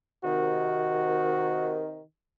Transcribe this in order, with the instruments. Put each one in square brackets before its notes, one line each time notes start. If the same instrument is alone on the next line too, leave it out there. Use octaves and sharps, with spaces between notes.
[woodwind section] C3 D#3 [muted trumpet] F#4